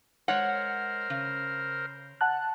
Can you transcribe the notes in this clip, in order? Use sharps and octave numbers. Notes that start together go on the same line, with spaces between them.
G#3 A#4 C5 C#5 F#5
C#3
F#5 A5 F#6